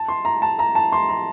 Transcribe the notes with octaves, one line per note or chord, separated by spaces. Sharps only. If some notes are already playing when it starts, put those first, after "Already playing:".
Already playing: A5
C6
A#5
A5
A#5
A5
C6
A#5